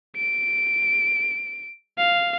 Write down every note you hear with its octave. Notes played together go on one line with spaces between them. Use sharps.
D7
F5